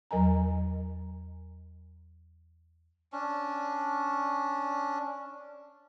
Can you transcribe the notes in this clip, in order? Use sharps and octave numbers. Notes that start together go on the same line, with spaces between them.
E2 F#3 A#4 D#5 G#5 A#5
C#4 D4